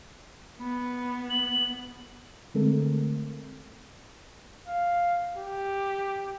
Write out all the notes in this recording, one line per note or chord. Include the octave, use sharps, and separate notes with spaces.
B3 B5
F#7
D3 G#3 A3 C4 A4 A#4
F5
G4